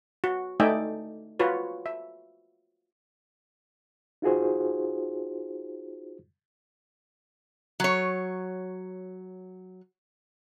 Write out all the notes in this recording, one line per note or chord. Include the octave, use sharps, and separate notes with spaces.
F#4
A3 D#4 D5 E5 G5 G#5
F4 F#4 B4 C#5
E5
D#4 F4 F#4 G#4 C5
F#3 C#5